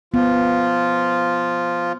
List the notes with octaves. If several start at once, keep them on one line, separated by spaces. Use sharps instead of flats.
F3 B3 F4